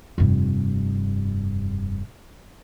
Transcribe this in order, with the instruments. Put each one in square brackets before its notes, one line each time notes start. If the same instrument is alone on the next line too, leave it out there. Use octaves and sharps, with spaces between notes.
[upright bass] F1 G2